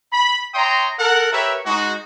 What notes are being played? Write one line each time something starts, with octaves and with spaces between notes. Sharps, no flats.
B5
C#5 E5 G5 A#5 C6 D#6
A4 A#4 F#5
G4 A#4 B4 C#5 E5
G#3 D#4 F#4